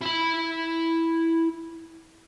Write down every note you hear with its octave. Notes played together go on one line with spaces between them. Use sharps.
E4 B5